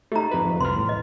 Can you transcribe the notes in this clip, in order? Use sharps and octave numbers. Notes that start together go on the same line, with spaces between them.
A3 D#4 G4 A#5
F2 B4
F2
C2 B4 C6 F6
E2 A2
D#5